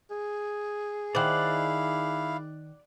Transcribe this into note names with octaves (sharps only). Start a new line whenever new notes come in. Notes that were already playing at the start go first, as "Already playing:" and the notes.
G#4
D#3 E4 C5 D5 F5 F#5